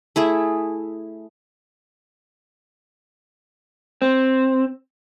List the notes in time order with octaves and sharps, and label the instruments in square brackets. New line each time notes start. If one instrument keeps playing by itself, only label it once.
[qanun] A3 E4 G#4
[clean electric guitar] C4